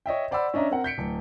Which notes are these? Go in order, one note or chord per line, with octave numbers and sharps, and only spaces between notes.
C#5 D#5 E5 G5
C5 D5 F#5 B5 E6
C#4 D4 D#5 E5 A#5
C4 A#4 F#5
G6 B6 C#7 D7
D1